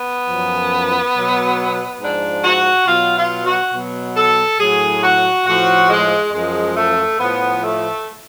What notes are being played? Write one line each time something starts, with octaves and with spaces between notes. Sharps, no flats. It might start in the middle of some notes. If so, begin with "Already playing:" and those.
Already playing: B3
F#2 F3
B2 F#3
G#2 F3 D4
F#4
B2 F#3 F4
F4
F#4
B2 F#3
A4
A2 F#3 G#4
F#4
A2 F3 F#4
G#3
F#2 F3 G#3
A3
A2 F3 B3
A3